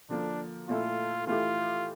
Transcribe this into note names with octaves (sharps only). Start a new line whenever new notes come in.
D3 F3 A#3 D4
A#2 A3 E4 F4 A4
E3 A3 E4 F4 G4